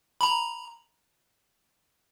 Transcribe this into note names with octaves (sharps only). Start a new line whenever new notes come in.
A#5 B5